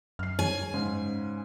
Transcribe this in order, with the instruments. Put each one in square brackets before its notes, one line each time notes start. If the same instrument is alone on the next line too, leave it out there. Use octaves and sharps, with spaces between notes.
[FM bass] F#2 [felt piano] F6 C7
[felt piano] C#5 [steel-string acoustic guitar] G#5
[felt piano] G#2 C#3